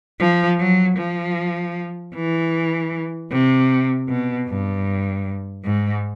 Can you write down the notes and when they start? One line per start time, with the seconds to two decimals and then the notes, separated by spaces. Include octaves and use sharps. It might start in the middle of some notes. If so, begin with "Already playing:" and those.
0.20 F3
0.59 F#3
0.98 F3
2.15 E3
3.31 C3
4.09 B2
4.48 G2
5.64 G#2